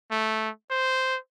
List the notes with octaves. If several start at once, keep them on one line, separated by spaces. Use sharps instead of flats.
A3
C5